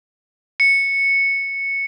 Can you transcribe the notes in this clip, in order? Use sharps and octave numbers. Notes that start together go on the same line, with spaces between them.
C#7